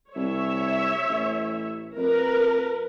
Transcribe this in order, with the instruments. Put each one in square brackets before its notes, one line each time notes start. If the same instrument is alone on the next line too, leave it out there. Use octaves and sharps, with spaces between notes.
[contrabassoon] C2 [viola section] C#5 E5
[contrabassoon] A1
[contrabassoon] F2 [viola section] A#4 B4